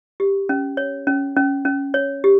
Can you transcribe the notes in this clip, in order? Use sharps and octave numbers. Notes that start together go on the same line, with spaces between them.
G4
C#4
C#5
C#4
C#4
C#4
C#5
G4